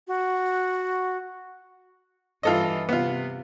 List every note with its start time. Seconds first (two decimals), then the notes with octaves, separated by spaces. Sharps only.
0.07 F#4
2.43 G2 E3 F4 A4 D#5
2.89 C3 B3 F4